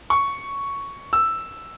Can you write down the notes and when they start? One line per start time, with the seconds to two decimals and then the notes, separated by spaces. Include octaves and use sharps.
0.10 C#6
1.13 E6